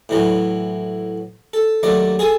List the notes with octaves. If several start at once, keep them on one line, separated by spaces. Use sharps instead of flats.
A2 E3 F#3
A4
D#2 F#3 A3 D5
G#4 A4 G#5